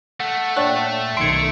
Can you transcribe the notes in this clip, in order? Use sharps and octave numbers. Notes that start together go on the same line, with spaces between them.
A3 F#5
A#2 D4 C#5 F#5 G5
B1 F#2 D#3 C6 G#6 C#7 D7